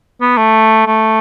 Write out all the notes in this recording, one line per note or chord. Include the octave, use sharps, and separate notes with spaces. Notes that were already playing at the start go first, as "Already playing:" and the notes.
B3
A3
A3